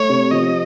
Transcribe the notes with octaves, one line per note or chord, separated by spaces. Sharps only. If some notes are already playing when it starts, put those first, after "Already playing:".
Already playing: A3 C#5
C3
F3 D#5